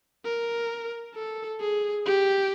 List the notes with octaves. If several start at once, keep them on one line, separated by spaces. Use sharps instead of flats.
A#4
A4
G#4
G4